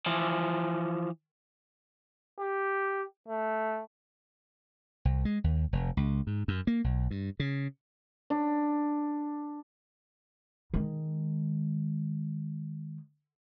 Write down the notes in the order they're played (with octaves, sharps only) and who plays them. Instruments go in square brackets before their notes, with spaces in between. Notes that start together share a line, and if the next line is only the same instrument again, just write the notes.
[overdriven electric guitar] E3 F3
[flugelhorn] G4
A3
[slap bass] C2
G#3
D#2
F1
C#2
G#2
F#2
A#3
B1
G2
C#3
[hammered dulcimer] D4
[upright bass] D#3 G#3